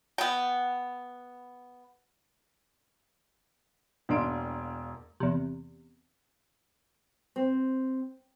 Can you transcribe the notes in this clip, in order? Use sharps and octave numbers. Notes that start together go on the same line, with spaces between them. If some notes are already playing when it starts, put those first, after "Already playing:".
B3 G5
E1 A#3 D4 C6 D7
E2 C3
C4